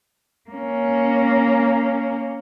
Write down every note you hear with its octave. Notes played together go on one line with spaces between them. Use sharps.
A#3 C#4